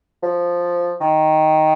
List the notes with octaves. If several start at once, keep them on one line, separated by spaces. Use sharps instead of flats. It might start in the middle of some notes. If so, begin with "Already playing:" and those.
F3
D#3